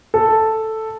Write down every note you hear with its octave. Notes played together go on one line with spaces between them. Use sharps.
A4